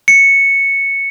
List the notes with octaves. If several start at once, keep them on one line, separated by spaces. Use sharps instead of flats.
C#7